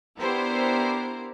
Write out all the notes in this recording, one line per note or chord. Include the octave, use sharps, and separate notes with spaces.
B3 D4 E4 G4 A#4 C5